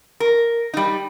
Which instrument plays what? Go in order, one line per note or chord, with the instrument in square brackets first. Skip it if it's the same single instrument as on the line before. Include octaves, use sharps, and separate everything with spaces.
[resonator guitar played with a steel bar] A#4
G3 D#4